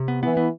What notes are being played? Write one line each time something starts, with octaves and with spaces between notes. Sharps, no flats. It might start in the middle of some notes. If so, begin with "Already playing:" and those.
Already playing: C3
B3
E3 B3
B3